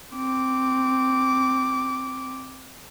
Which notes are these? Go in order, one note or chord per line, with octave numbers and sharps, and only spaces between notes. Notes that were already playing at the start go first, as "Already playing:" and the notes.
C4 D6